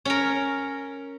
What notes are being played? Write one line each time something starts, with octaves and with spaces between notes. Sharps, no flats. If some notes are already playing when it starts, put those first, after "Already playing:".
C#4 A#4